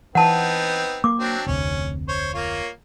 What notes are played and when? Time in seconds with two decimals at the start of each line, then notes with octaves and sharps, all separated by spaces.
0.15 E3 B3 C4 D#4 F#5 A5
1.04 A#3 D6
1.19 F#3 C4 D4
1.46 F1 D2 C3 C#4
2.08 C5 C#5
2.34 A#3 F4 C#5